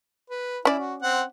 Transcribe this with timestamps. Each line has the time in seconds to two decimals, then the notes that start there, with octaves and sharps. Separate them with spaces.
0.30 B4
0.65 C#4 E4 D5
0.79 F#4
1.02 C4 F#5